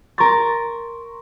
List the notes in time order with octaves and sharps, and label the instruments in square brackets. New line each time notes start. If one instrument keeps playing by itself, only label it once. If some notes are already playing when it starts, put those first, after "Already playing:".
[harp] A#4 A6 [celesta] C6 C#6